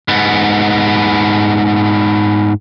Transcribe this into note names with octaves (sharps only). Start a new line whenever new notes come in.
G#2 B3